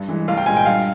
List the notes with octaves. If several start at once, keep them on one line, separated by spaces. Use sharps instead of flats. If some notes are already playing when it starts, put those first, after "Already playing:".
Already playing: G2
E3 G#3
C2 F5
G5
A#2 G#3 G#5
G5
G2 F5